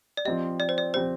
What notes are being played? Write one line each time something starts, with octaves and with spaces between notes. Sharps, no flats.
D5
F3 C4 G4 D#5
D5
C5
D5
F3 C4 G4 C5